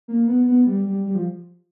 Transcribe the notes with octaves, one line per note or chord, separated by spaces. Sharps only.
A#3
B3
B3
G3
G3
G3
F3